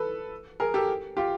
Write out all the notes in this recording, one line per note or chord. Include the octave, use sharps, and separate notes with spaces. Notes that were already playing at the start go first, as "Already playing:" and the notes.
Already playing: A4 B4
G#4 A#4
G4 A4
F4 G4